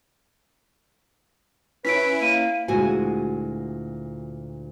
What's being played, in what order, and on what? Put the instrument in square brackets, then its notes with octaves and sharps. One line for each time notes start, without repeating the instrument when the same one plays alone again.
[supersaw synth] C#4 E4 [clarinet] B4 [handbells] B6 D7
[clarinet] A#3 [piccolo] D#7
[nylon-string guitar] D2 A#2 G#3 E4 F#4 G#5